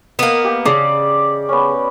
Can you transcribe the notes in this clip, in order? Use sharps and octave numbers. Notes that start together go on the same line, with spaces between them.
A#3 B3 D#5 F#5
G4
C#3 D5
B3 C#4